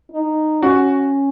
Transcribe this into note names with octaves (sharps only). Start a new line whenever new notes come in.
D#4
C#4 F#4